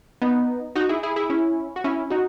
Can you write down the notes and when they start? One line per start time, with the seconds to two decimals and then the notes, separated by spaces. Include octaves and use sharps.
0.22 B3 D#4
0.75 D#4 F#4
0.89 E4 G#4
1.03 E4 G#4
1.16 E4 G#4
1.30 C#4 E4
1.76 F#4
1.84 C#4 E4
2.10 D#4 F#4